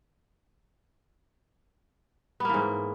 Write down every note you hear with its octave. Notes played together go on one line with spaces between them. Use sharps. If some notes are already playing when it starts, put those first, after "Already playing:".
G#2 E3 A#3 B3